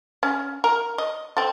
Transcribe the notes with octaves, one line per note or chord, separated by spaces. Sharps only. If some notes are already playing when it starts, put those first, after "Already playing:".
C#4
A#4
D#5
C4 A4